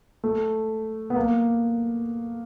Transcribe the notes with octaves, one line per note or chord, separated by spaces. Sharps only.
A3
B3
A#3